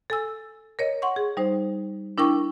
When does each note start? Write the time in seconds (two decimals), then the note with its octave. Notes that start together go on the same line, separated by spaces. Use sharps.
0.10 A4 G#5 E6
0.79 A#4 C#5 D#5
1.02 F#5 C6 C#6
1.16 G#4
1.37 G3 D#4 C5
2.18 D4 E4 A#4 G5 C#6